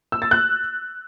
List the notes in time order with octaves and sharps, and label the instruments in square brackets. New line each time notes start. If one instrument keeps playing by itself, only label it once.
[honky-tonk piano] E6
A6
F#6